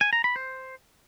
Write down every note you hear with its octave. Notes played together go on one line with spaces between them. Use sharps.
G#5
A#5
B5
C5